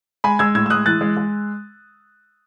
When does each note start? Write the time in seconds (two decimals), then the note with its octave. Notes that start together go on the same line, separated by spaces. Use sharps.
0.24 G#3 G#5 B5
0.39 G#3 E6 G#6
0.55 A2 E6 G#6
0.66 E6
0.70 G#3 D#6 F#6
0.86 E3 F#6 A6
1.01 G#3
1.17 G#3